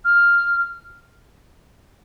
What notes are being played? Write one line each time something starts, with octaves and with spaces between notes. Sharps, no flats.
F6